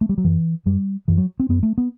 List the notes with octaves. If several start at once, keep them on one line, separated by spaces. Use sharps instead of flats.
A3
G3
F#3
F#2 E3
F#2 G3
F#2 E3
F#3
C4
F#2 B3
A3
B3